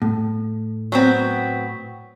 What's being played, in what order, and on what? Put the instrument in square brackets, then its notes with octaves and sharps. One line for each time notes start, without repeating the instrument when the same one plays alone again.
[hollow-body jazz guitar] A2
[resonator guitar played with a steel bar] F#3 B3 C4